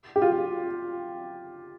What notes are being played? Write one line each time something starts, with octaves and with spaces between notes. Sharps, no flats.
G4
F4